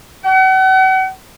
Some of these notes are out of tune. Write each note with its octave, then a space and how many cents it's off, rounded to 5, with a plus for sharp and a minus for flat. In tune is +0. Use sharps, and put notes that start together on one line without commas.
F#5 +40